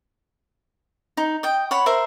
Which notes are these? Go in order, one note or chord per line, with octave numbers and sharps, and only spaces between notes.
D#4
D#5 G5
C#5 F#5 B5
A#4 C5 E5